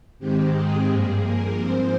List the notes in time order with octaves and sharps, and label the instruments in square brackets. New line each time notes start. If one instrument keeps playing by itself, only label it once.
[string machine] G#2 D#3 G#3 C4 G4
G#4
G2 F3 A#3 G#4
A#4
G#2 F3 C4 C5